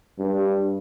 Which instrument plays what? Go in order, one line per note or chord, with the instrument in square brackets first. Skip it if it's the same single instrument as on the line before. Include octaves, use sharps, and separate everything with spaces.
[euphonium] G2